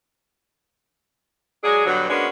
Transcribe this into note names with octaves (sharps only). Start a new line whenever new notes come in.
F#3 G#3 D4 G#4
G2 B2 D3 F#3
G#3 A#3 B3 C#4 D4 F#4